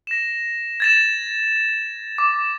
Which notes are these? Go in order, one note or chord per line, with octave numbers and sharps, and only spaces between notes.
A#6 E7
G#6 A6 E7
D6